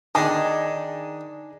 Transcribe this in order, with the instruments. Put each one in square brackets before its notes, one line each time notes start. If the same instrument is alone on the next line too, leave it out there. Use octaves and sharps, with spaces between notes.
[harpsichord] D#3 D4 [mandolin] D#4 G#4 [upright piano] D#5 [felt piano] A5